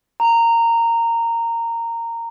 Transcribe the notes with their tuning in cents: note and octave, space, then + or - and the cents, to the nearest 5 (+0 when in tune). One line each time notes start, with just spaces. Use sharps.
A#5 -15